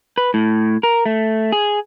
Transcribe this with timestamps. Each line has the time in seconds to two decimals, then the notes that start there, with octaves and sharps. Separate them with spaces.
0.18 B4
0.34 A2
0.83 A#4
1.06 A3
1.52 G#4